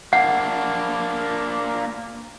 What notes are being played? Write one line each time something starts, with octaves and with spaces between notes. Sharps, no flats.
A#3 D4 F#5